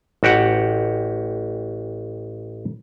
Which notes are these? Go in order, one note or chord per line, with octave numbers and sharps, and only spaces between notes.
A1 F#4 G4 F#5